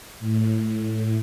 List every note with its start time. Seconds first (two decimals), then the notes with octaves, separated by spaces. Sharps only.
0.20 A2